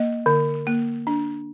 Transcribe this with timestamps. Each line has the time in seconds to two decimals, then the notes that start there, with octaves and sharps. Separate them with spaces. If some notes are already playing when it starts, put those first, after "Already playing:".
Already playing: A#3 D#5
0.26 D3
0.67 A#3
1.07 D4